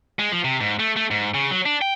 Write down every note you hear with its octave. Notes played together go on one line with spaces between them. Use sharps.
G#3
F3
C3
G#2
A3
A3
G#2
C#3
F#3
D4
G5